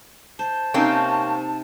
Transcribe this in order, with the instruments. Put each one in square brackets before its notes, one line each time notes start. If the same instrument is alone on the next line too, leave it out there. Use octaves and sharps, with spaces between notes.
[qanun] C5 [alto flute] A5
[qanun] C3 D#4 C6 [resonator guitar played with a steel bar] A#3 C4 C#4